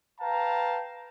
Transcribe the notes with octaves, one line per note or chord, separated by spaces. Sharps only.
B4 F5 G5 A5 A#5